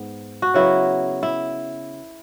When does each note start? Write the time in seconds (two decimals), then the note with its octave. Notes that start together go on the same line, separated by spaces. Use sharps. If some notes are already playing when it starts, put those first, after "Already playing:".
Already playing: G#2 B3
0.42 F#4
0.54 C#3 F#3 B3 E4
1.23 E4